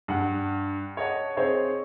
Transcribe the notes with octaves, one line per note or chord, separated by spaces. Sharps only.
G2 F#5
C#5 D#5 F#5 A5
C4 G#4 C5 C#5 D#5